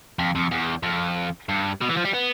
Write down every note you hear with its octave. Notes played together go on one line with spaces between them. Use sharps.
F2
F2
E2
F2
G2
B2
E3
F3
G3
B3